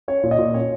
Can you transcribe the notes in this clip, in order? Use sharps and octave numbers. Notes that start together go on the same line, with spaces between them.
C#4 C#5
A#2
D#5
A#2
C#4 C#5